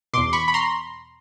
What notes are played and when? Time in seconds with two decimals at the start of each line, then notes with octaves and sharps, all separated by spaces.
0.13 E2 B2 C6 D6
0.33 B5 C#6
0.48 B5
0.54 A#5 C6